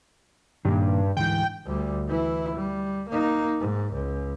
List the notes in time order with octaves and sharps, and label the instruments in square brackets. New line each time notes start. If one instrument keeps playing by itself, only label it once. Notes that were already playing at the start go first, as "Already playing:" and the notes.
[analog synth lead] G2 [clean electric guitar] A#2 D#3
[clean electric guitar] D2 G#2 E3 [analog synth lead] G5
[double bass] D2 G3
E3 E4
G3
A#3 D#4
G#2
C#2